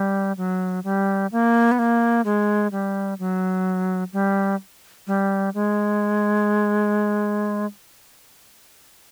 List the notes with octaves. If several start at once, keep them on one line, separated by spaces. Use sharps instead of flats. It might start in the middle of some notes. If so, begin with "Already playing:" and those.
Already playing: G3
F#3
G3
A#3
B3
A#3
G#3
G3
F#3
G3
G3
G#3